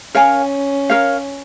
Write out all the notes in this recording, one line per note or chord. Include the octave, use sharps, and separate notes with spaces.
C#4 A#4 C#5 F5 G#5
A#4 C#5 F5